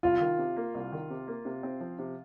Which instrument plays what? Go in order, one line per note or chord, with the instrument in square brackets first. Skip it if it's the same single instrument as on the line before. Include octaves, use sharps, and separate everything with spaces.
[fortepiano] C2 [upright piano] F4
[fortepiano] D#3
C3
A#3
C2
D#3
C3
A#3
C3
C4
F3
C3